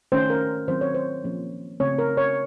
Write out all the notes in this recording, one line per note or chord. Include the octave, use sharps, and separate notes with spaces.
D#3 A3 C#4 C5
A#4
D#3 F#3 C4 C5
C#5
C5
F3 A#3 C#4
C#3 A3 C4 C#5
A#4
C#5